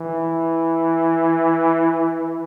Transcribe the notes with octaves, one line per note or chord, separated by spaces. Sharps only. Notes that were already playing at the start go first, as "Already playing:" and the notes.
Already playing: E3